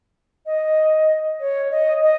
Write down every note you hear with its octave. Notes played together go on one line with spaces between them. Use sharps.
D#5
C#5
D#5
D#5